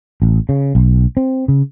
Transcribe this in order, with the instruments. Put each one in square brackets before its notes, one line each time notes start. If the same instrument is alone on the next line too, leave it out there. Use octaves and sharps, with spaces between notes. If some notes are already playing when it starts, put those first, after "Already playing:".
[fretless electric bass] A1
C#3
B1
C4
C#3